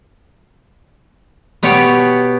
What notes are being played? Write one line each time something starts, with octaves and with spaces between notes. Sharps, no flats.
B2 B3 G4 C#5